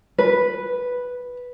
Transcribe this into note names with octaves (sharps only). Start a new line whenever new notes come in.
B4